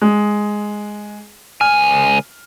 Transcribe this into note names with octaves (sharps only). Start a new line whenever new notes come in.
G#3
C#2 G#5 F6